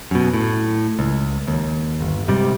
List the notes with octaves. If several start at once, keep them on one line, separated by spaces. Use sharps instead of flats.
F#2 B2
A2
C#2
D#2
G1
G#2 C3 G3